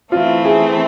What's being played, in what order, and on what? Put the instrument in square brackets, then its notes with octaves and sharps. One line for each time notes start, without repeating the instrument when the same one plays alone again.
[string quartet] E3 A3 C4 [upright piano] F4
[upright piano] G#4